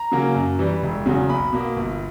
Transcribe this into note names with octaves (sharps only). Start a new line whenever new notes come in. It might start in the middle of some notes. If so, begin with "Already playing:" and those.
Already playing: A#5
C#3 F#3 A#3
F#2
E3 G3
E1
E2 C#3 F#3
B1 B5
B2 A#3
G1